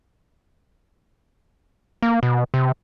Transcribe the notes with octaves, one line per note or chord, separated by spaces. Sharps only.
A#3
B2
C3